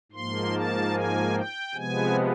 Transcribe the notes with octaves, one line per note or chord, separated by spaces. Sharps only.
G#2 F3 A#3 C6
A5
G#5
G5
C3 F3 G#3 B3 G#5